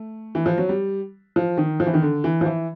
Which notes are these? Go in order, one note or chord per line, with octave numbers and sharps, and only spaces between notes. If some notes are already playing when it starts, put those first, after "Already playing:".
Already playing: A3
E3
F3
F#3
G3
F3
D#3
F3
E3
D#3
D3
E3
F3
E3